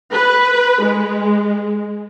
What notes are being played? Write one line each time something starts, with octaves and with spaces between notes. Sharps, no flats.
B4
G#3